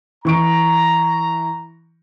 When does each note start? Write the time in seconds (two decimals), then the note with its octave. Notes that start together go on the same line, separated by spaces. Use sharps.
0.25 E3 A#5 C#6 D7